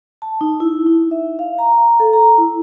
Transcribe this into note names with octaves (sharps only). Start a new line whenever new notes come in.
A5
D#4
E4
D#4
E5
F5
A#5
A4
A#5
E4